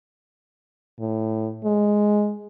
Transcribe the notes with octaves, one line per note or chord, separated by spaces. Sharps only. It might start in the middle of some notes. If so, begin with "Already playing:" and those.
A2
G#3